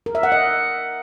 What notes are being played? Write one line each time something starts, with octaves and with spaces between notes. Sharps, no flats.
A#4
E5
F#5
D#5